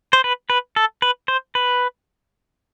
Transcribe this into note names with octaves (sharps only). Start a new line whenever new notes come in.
C5
B4
B4
A4
B4
C5
B4